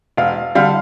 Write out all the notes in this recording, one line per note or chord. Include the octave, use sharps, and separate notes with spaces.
E1 F5
D3 G3 F5